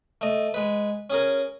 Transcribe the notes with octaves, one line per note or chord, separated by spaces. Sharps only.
A3 D#5
G#3 B4
C#4 G#4 A#4